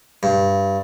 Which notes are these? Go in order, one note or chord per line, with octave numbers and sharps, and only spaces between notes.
G2